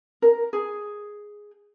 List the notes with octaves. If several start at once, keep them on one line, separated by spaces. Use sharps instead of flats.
A#4
G#4